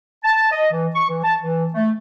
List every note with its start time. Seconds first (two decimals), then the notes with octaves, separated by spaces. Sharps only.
0.24 A5
0.52 D#5
0.72 E3
0.95 C#6
1.09 E3
1.24 A5
1.42 E3
1.74 A3